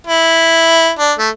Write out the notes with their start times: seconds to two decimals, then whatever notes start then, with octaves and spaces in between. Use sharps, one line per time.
0.07 E4
0.99 D4
1.19 A3